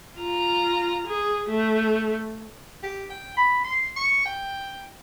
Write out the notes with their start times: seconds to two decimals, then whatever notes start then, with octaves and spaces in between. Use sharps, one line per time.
0.17 F4 A#5
1.07 G#4
1.49 A3
2.83 G4
3.10 G5
3.37 B5
3.64 C6
3.96 C#6
4.26 G5